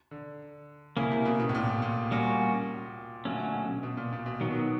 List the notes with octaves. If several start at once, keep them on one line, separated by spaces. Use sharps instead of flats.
D3
C#3 A#3 C#4 E4
C3
B2
B2
A2
A#2
A#2
A#2 G3 A#3 C#4 F#4
A#2 D3 F#3 A3 C#4
B2
B2
A#2
A#2
B2
B2 D#3 F#3 B3